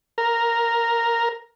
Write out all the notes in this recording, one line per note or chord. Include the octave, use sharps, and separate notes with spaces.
A#4